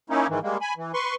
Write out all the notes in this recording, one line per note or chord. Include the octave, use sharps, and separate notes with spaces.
A#3 C#4 D#4 E4
G#2 D#3 E3
G3 G#3 A#3
G#5 B5
E3
B4 C6 C#6